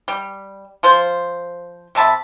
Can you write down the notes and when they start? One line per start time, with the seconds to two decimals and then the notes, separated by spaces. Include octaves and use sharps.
0.08 G3
0.83 F3 F4 C5
1.95 C3 E5 A5 B5